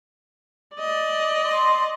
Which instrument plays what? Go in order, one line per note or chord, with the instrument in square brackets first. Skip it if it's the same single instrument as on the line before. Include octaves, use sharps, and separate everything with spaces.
[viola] D5 D#5
[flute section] C6